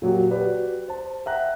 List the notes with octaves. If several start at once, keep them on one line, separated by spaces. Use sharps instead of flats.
A#2 F#3 F#4 G4
F#4 G4 B4 D5
C5 A5
E5 F#5 G5 A#5 F#6